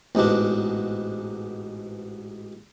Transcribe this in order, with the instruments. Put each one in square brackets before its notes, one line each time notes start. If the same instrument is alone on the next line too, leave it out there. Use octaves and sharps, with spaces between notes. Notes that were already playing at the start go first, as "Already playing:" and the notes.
[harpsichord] A1 G#2 B2 D4